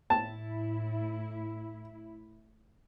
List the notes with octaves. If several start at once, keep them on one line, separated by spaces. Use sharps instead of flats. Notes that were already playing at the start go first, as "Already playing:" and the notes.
A2 E4 A5